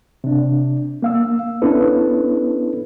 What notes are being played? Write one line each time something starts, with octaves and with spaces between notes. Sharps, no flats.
C3 D4
A#3 F5 E6
B3 C#4 D4 E4 A4 B4